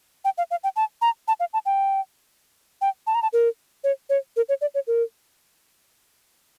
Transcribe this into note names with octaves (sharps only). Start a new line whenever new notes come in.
G5
F5
F5
G5
A5
A#5
A5
F5
A5
G5
G5
A5
A#5
A5
A#4
C#5
C#5
A#4
C#5
D5
C#5
A#4